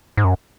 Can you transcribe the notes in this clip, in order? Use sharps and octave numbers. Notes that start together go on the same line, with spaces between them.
G#2
F#2